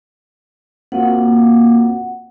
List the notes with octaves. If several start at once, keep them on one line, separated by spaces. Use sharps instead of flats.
A#3 C4 F4 F#4 F#5